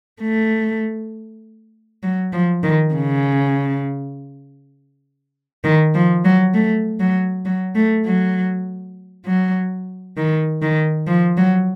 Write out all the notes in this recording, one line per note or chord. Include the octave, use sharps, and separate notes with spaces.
A3
F#3
F3
D#3
C#3
D#3
F3
F#3
A3
F#3
F#3
A3
F#3
F#3
D#3
D#3
F3
F#3